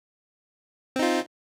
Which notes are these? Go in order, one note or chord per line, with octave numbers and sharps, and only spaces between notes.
C4 D#4 F4